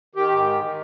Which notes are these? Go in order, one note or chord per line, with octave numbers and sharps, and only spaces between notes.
D#3 G4
G#2
D#3
D#3